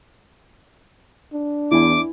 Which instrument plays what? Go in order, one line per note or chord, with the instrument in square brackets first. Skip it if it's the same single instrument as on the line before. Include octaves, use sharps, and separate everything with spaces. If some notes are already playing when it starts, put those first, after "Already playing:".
[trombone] D4
[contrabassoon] E2 [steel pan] E4 G#5 [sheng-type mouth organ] D6